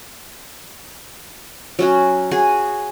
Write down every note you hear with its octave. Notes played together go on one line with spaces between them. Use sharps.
F#3 C#4 F#4
F#4 G#4 G#5